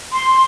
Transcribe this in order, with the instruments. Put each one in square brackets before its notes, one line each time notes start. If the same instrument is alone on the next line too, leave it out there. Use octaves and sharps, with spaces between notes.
[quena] C6